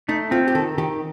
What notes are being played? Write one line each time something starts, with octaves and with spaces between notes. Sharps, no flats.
A3 D#4
C4 F4
G4
D#3 A4
D#3 G4